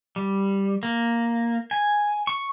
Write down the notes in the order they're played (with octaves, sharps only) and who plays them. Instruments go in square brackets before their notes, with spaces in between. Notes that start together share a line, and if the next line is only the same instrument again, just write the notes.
[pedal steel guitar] G3
A#3
G#5
C#6